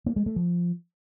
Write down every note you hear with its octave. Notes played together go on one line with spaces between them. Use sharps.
A#3
G#3
A3
F3